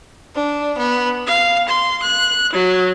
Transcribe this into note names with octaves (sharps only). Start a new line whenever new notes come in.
D4
B3
F5
C6
F#6
F#3